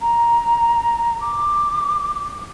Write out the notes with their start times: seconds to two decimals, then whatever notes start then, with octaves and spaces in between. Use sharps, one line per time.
0.01 A#5
1.21 D6